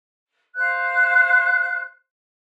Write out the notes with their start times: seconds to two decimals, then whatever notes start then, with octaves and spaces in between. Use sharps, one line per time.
0.56 C5 F5 F#6